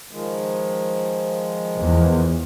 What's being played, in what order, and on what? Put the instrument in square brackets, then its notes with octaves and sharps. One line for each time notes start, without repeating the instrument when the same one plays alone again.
[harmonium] D#3 F3 G#3
[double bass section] E2